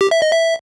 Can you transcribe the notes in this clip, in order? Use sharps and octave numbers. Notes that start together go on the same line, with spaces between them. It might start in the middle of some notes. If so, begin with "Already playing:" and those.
G4
E5
D#5
E5